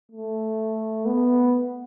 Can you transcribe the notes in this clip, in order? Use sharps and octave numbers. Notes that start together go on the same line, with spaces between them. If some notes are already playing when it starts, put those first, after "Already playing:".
A3
B3